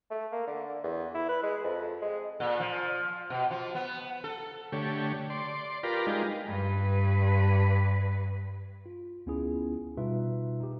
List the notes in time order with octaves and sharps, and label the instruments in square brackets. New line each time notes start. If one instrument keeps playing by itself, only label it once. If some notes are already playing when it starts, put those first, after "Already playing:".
[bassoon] A3
A#3
D3
E2
E4
B4
G#3
F2
G#3
[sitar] A#2
F3
B2
F3
B3
A4
[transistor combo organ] D3 A3 G4 C#5
D5 C6
F4 G4 A#4 B4 D5
G#3 D#4 F4 G4
[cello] G2 B4
[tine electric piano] F4
D2 B3 C#4 E4 F4 G#4
B2 G3 D#4 F4 B4 E5
D#4 G4